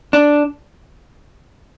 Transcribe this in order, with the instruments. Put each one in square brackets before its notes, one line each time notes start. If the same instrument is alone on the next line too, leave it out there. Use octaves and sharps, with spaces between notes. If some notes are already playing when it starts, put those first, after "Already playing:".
[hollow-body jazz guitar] D4